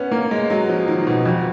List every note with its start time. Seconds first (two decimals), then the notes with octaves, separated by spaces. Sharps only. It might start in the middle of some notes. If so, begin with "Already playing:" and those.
Already playing: B3 C#4
0.12 A#3
0.31 G#3
0.50 F#3
0.69 F3
0.88 D#3
1.07 B2
1.26 F2